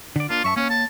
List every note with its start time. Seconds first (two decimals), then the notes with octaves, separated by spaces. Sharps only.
0.16 D3 D5
0.30 A#3 D4 F4
0.44 F#2 E5 A5 C#6
0.56 A#3 C#4 C#5
0.70 A5